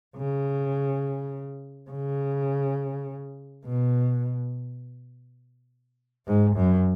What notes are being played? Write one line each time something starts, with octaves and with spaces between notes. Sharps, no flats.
C#3
C#3
B2
G#2
F#2